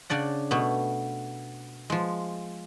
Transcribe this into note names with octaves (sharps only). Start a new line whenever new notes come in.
C#3 D4 D5 F#5
B2 A3 B3
F3 G#3